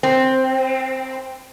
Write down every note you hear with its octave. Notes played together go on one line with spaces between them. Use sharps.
C4